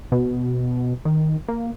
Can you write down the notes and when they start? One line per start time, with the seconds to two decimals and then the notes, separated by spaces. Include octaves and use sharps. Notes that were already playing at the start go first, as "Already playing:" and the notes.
0.12 B2
1.05 D#3
1.48 A#3